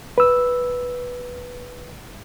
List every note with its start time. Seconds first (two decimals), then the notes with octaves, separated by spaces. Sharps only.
0.18 B4 E6